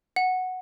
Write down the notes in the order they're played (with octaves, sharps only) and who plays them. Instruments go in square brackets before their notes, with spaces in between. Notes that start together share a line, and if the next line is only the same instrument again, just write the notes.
[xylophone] F#5